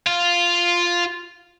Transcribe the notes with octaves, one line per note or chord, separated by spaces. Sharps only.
F4